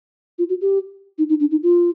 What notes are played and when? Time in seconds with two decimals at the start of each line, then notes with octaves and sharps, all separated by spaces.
0.39 F4
0.49 F#4
0.61 G4
1.18 D#4
1.29 D#4
1.40 D4
1.51 D#4
1.63 F4